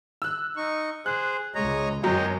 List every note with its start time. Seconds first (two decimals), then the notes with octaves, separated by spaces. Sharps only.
0.22 E6 F#6
0.57 D#4 C#6
1.06 G#4 C5 F#6
1.55 C#2 G#3 C#5 D#5 A#5
2.04 G1 F#2 F#3 D#5 G5 A#5